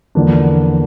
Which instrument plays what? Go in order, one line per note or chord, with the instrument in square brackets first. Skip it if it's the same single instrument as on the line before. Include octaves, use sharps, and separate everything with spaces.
[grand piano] E2 D3 F3 A#3 D4